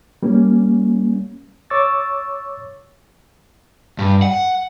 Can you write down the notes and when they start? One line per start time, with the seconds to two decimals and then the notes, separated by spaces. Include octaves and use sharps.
0.23 G3 A#3 C#4
1.70 C#5 C#6 D6 E6 A6
3.99 G2
4.22 F#5